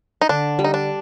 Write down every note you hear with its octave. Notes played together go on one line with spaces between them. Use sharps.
D#4
D3 D4
G3
D#4
D4